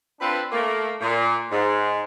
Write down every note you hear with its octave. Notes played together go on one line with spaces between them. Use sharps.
C4 D4 F4 A4 B4
A3 A#3
A#2
G#2